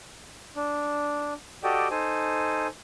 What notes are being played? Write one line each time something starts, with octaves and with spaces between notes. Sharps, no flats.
D4
F#4 G4 A4 D5 D#5 G5
D#4 A4 C5 G#5